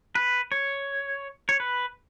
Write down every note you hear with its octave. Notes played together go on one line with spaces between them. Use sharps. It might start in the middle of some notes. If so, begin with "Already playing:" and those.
B4
C#5
C#5
B4